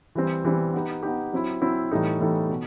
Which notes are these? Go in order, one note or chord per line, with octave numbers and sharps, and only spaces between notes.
E3 G3 C4
E3 G3 C4
B3 D#4 G4
B3 D#4 G4
F#3 C4 E4
F#3 C4 E4
A2 E3 G3 D#4 A4
A2 E3 G3 D#4 A4
B2